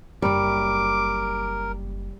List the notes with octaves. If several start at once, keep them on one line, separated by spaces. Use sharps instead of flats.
F#1 G3 D4 A#4 D6